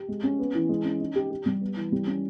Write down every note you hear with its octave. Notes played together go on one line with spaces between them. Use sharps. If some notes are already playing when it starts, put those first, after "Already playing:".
Already playing: G4
G#3
C#4
B3
E3
G#3
C#4
D#4
G4
G4
G3
B3
E3
G3
C#4